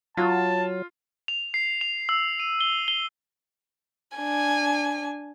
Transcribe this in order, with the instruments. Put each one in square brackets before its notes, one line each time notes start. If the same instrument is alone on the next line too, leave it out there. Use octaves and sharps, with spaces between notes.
[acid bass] F#3 [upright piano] F4 [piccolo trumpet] A5
[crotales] F7
C7
F7
E6
D#7
G7
G7
[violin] D4 G#5